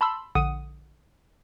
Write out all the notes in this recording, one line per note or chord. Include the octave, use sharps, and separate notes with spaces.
A5 B5 C6 E6
A#1 D3 F#5 D#6 D#7